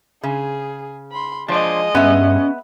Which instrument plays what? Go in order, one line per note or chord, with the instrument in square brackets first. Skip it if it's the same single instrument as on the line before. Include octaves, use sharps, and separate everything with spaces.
[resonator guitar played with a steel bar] C#3 [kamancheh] G#4
[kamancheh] B5 C6
[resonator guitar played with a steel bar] F3 [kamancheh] G#3 D#5 [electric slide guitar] D4 C5 D5
[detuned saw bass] G2 [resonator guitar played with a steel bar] B3 E5 [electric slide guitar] C#4